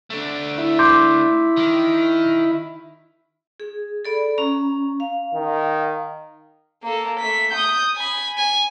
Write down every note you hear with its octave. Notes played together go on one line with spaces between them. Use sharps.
A3 D4
E4
C6 D6 G6
D#3
G#4
A4 D5 B5
C#4 A#5
F5
D#3
A#3 A4
A3 B6
D#6 G6
G#5 B5
G#5